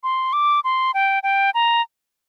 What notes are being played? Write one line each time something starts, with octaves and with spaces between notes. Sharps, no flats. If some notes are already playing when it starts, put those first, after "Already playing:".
C6
D6
C6
G5
G5
A#5